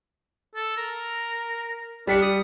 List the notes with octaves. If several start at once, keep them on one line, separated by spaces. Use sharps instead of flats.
A4
A#4
G3 D4 B6 C#7
D#6